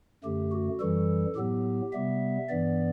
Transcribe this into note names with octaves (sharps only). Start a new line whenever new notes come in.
F#2 D3 A3 G4
F#4
F#2 E3 G3 A4
A2 F#3 B3 G4
C3 G3 B3 E5
G2 E3 B3 D5